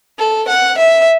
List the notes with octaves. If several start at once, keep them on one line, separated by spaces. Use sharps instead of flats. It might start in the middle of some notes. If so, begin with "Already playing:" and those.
A4
F#5
E5